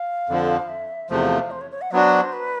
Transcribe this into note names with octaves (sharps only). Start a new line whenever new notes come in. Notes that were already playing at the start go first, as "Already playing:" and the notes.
Already playing: F5
F2 D3 F3
E5
E2 C3 F3 A3 F5
C5
C#5
C#5
F#5
F#3 B3 D4 F#4 C5
B4